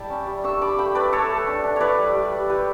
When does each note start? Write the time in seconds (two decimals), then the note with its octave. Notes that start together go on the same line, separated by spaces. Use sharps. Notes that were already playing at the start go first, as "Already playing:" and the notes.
Already playing: G3 E4 E5 G5 A5
0.10 C#4
0.27 G3
0.44 D4 C#6 E6
0.61 D4 B5 D6
0.78 A3 G5 B5
0.95 A3 B4 D5
1.12 A3 A4 C#5
1.30 A3
1.47 D4
1.64 D4
1.76 E4 B4 C#5 D5
1.98 G3
2.15 G3
2.32 G3
2.49 E4 G4 B4